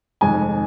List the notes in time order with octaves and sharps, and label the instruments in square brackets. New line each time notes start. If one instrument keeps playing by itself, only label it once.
[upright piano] F1 F2 D#3 G#3 G#5